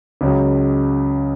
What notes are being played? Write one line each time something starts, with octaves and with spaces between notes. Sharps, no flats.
C#2 C#3 F#3